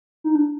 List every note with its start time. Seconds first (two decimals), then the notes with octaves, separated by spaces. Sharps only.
0.24 D#4
0.35 D4